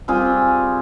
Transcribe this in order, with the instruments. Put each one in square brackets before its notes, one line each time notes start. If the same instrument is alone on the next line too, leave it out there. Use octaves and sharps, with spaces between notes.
[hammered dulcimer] G3 C4 F4 G#4